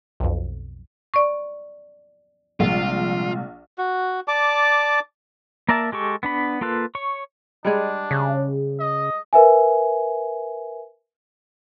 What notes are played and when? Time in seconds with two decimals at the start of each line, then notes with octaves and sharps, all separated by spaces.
0.20 B1 F2
1.14 D5 C#6
2.60 A#1 C3 G3 G#3 F4
3.78 F#4
4.28 D5 A5 D6
5.69 A#3 A#4 D5 E5 A5
5.92 G#3 G4 A4 C#6
6.23 B3 D4 B5
6.61 A#3 F4 A4 B4
6.95 C#5 C#6
7.65 G3 G#3 D4 G#4
8.11 C#3
8.80 D#5
9.33 A#4 B4 E5 G#5